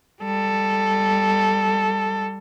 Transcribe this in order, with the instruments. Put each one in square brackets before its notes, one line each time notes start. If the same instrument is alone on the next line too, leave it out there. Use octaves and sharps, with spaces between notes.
[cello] G3 A4